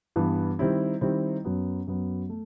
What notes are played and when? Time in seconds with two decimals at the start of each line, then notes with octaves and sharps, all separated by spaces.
0.16 G2 E3 B3
0.59 D#3 G3 C4 E4
1.01 D#3 G3 C4 E4
1.45 F#2 F#3 B3
1.87 F#2 F#3 B3
2.29 A3